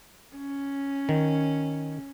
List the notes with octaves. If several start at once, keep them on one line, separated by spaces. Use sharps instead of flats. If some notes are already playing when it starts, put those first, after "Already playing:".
C#4
D#3